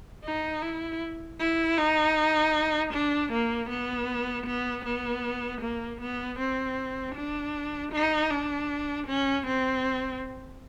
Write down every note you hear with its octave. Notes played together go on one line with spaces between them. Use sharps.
D#4
E4
E4
D#4
D4
A#3
B3
B3
B3
A#3
B3
C4
D4
D#4
D4
C#4
C4